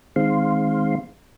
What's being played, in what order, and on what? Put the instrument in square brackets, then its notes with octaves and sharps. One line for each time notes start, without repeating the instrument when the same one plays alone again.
[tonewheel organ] D#3 G#3 C4 F5 C6